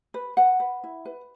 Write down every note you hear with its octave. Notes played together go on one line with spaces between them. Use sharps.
B4
B4 F#5
B4
E4
B4